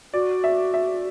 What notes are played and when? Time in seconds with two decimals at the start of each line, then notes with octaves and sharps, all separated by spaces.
0.13 F#4 D5
0.44 E5
0.74 E5